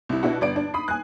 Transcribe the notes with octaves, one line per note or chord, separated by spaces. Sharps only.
C2 E4
B2 D4 E4 F#4
G1 D5 D7
D4
B5 D#6 C7
G#5 F#6